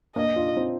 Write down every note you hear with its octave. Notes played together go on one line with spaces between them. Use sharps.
A#3 D4 D#5
D4 F4
C4 D#4